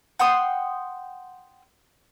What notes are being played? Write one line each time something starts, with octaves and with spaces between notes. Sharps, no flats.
F#5 G5 C6 D#6